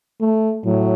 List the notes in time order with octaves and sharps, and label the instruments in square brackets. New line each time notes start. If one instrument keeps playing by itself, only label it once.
[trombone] A3
[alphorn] A2 [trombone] F#3